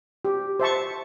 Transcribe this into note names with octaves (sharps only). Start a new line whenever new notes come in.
G4
C5 E5 A5 C#6